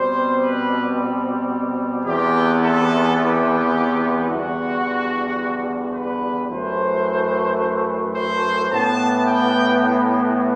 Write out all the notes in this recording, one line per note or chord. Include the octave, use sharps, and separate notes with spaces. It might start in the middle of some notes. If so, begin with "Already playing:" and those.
Already playing: B2 G3 C4 C5
B4
E2 C3 E3 B3 G4
A4
G4
E2 D3 G3 F#4
B4
F#2 E3 A3 C5
C5
A2 E3 B3 A5
G5